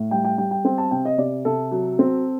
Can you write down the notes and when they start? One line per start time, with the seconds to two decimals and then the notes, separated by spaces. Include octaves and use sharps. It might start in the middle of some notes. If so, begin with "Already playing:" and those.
Already playing: A2
0.11 G3 G5
0.25 G5
0.38 G3 G5
0.51 G5
0.65 C4 G5
0.78 A5
0.91 C3 G5
1.05 D#5
1.18 C3 D5
1.45 C3 A4
1.72 F#3
1.99 C4